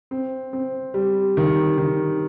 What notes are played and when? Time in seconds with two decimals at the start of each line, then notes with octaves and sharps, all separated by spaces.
0.11 C4
0.53 C4
0.94 G3
1.37 D#3
1.78 D#3